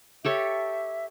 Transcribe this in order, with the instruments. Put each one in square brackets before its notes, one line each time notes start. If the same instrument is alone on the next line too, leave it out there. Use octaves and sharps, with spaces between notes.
[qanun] G4 A4 C#5 [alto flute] E5